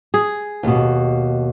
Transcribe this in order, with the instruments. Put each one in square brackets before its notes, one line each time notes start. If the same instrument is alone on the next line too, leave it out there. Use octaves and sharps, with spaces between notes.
[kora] G#4
[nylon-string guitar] D#2 B2